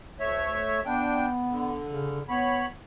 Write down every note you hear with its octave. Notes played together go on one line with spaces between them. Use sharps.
D2 A3 C#5 E5
B3 D4 G5
D3
C#3
B3 C#5 B5